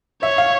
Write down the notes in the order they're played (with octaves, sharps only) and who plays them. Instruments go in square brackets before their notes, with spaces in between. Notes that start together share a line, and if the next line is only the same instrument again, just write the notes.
[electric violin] C#5 [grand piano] E5
[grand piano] F5